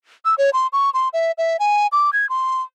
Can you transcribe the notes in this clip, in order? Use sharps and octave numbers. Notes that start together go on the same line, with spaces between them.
E6
C#5
C6
C#6
C6
E5
E5
G#5
D6
G#6
C6